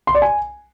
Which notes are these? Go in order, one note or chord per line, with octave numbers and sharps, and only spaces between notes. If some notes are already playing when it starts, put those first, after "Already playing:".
C6
D5
G#5